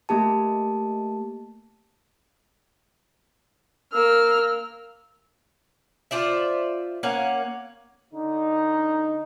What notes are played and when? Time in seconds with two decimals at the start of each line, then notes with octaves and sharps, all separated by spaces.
0.09 A3 A#3 G4 A5
3.93 A#3 E6 F6
6.11 F4 C5 D5 E5
7.03 A#3 C#4 F5 F#5
8.14 D3 D#4